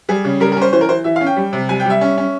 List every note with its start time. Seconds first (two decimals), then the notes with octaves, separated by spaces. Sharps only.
0.09 G3 G#4
0.25 C#3
0.40 G3 A#4
0.52 A#4
0.57 C#4 C5
0.73 E3 C5
0.81 A#4
0.89 E3 C5
1.04 E3 E5
1.16 F5
1.21 C#4
1.26 G5
1.36 G3
1.53 C3
1.69 G3 G#5
1.80 G5
1.86 G3 E5
2.01 C#4
2.18 C#4